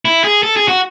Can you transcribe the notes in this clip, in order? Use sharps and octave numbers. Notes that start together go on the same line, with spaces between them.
E4
G#4
A4
G#4
F#4